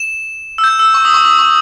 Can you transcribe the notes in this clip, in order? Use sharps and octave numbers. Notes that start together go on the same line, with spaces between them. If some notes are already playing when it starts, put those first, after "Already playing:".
Already playing: E7
E6
G6
E6
C#6
D#6
C#6
D#6
C#6